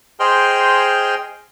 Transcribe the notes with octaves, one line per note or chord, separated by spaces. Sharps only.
G#4 C5 D#5 G5 C6 F6